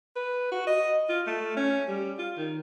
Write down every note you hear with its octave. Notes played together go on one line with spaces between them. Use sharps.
B4
F#4
D#5
F4
A3
C#4
G3
F4
D#3